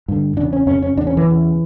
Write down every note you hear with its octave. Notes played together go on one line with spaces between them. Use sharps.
G2 D3
E2 C#3 D4
C#4
F2 C#3 C#4
C#4
E2 C#3 D4
C#4
E3
E2 C#3